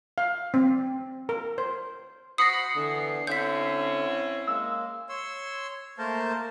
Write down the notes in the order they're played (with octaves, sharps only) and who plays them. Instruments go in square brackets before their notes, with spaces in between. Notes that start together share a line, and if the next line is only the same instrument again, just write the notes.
[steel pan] F5
C4
A#4
C5
[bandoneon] F#4 C5 [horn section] B5 [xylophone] D#6 A#6 [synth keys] C7 C#7
[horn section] D3 [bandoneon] E3 B3
[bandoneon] D3 [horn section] C4 C#4 E4 [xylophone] G6 B6
[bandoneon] G#3 A#3 [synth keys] E6
[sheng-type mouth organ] C#5 C6 E6
A3 A#3 A#4 C5 A5